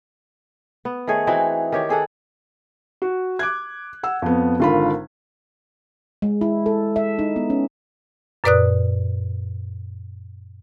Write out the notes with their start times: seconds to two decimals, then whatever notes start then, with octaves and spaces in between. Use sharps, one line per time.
0.85 B3
1.07 D#3 A3 G#4 C#5
1.27 E3 C4 D#4 F#4
1.72 D#3 G4 C#5
1.89 C4 G#4 A4 F#5
3.02 F#4
3.39 D6 F#6 G#6
4.03 F#5 E6
4.22 F2 B3
4.60 G#1 D3 F4 A#4 B5
6.22 G#3
6.41 E4
6.66 A4
6.96 E5
7.19 D#4
7.36 B3
7.50 C#4
8.44 F#2 A#2 B4 D5 D#6 F#6